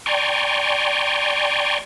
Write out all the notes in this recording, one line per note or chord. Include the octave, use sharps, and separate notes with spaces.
D5 G5 G#5 A#5 C6 C#6